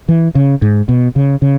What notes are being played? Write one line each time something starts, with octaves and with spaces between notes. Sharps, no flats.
E3
C#3
G#2
B2
C#3
C#3